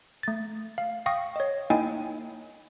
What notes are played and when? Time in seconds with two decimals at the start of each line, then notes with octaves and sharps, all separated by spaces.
0.23 A3 A6
0.78 F5
1.06 F5 G5 C#6 D#6 A#6
1.36 C#5 D#5
1.70 A#3 D#4 E4 D#5 G5 G#5